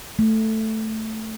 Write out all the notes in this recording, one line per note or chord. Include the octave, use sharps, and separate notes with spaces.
A3